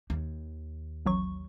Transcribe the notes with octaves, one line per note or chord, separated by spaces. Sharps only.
D#2
A1 F#3 C#6